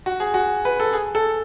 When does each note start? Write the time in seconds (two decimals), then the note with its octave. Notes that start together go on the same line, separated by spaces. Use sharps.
0.06 F#4
0.20 G#4
0.34 F#4
0.65 B4
0.80 A4
0.93 G#4
1.15 A4